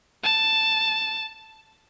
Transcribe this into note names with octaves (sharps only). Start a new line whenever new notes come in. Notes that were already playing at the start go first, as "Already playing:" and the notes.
A5